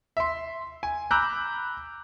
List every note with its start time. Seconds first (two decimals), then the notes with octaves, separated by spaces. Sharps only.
0.17 E5 C6
0.83 G#5
1.11 A#5 B5 D6 E6 F#6 G6